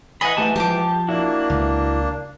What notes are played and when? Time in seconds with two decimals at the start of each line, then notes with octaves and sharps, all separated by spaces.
0.21 E3 D#5 F#5 G#5 B5
0.37 G#2 E3 A3 G4 A5
0.56 F3 G4 A5 D6
1.08 A#3 D4 E4 F#4
1.50 C#2